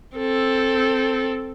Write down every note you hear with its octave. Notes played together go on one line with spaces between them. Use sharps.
C4 A4